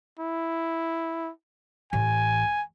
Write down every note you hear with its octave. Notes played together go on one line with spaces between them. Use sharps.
E4
A1 G#5